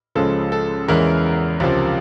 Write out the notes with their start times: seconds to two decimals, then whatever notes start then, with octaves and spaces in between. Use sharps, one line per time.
0.15 C#2 C#3 F3 G#3 A4
0.52 A4
0.88 E2 C#3 E3 G#3 A#4
1.60 C#2 C3 F3